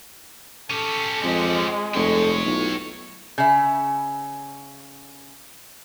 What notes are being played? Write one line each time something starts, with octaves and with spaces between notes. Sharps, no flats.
C#4 G4 A4
F2 G#3
F1 A4 C#5 G5
B1 A3 E4 F4
C#3 E5